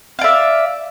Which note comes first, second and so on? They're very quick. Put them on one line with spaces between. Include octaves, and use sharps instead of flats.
F5 D5 E5